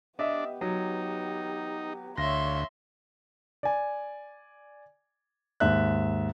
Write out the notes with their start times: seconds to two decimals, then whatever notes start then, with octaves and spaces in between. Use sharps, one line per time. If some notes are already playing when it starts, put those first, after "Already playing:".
0.19 B3 D4 G4 D#5 E5
0.61 F#3 D#4
2.18 D2 C#5 E5 F5 C6 A#6
3.63 D5 G#5
5.60 D#2 G#2 E5 F#6